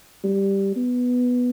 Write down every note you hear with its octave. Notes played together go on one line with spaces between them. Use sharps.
G3
B3